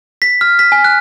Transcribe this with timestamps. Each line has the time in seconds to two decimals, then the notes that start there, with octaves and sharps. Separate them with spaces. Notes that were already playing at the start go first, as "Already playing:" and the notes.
0.22 B6
0.41 F6
0.59 B6
0.72 G#5
0.84 F#6